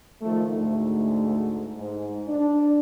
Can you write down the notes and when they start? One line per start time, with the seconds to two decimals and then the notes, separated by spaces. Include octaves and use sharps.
0.22 D#3 F3 A3
0.52 D2 G#2 A3
1.78 G#2
2.28 D4